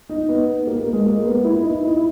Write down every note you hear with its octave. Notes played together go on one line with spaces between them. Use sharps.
D#4
B3
A#3
A#3
G#3
A#3
B3
E4
D#4
E4
E4